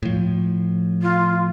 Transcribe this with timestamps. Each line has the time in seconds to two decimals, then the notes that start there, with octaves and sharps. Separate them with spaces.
0.03 A2 F3
1.02 F4